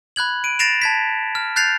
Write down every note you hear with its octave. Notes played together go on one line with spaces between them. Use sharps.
B5 F#6 G#6 F#7
D7 D#7
A6 A#6 C7 D7 E7 F7
A5 G#6 B6
F6
F#6 G6 A6 C7 F7